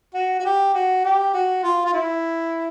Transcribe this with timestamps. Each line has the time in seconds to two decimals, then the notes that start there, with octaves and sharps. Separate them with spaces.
0.15 F#4
0.40 F#4
0.45 G4
0.74 F#4
1.04 G4
1.34 F#4
1.63 F4
1.85 F4
1.94 E4